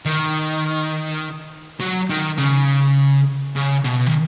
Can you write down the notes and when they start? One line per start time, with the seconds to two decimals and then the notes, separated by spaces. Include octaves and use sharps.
0.05 D#3
1.81 F#3
2.10 D#3
2.38 C#3
3.56 C#3
3.84 B2
4.07 D#3